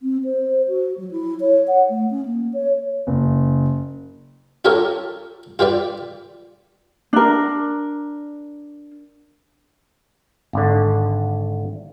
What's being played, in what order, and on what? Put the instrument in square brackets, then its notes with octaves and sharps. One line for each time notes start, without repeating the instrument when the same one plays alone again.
[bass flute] C4
C5
F#4
F#3
E4
C#5
F#5
A3
C#4
A#3
C#5
[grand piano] F#1
[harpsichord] F4 G4 A4 A#4 C#5
F4 G4 B4 D5
[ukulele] D4 A#4
[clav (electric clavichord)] G#1 D3